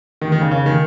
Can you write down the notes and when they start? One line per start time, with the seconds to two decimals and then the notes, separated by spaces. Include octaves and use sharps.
0.22 D#3
0.32 D#3
0.41 C#3
0.51 C#3
0.66 D#3